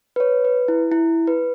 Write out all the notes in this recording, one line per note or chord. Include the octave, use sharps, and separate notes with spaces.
B4
C#5
B4
E4
E4
B4